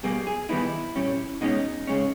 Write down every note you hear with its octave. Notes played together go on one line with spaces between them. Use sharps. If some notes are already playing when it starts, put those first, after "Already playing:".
B2 G3 A#3 G#4
G#4
D#3 G3 B3 D#4 E4
A#2 G3 C#4
B2 G#3 C#4 D#4
C#3 G#3 C#4